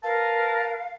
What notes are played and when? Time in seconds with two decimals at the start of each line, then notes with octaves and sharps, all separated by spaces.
0.03 A#4 B4 F5 A5